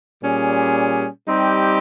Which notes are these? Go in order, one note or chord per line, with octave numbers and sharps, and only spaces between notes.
A#2 G3 C#4 G#4
G3 C4 D#4 G4